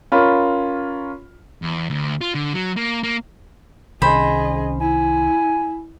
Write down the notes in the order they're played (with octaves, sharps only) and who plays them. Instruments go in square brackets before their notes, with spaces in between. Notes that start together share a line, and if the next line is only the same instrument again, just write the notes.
[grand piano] C#4 F4 A#4 B5
[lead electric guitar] E2
D2
F4
D3
F#3
A#3
A#3
[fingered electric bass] C2 C3 D#3 [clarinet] C#4 [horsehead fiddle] G#4 D#5 [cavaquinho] C5 B5
[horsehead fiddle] E4 [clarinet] G#5